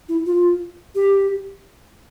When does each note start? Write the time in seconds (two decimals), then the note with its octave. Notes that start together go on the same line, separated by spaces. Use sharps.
0.09 E4
0.26 F4
0.95 G4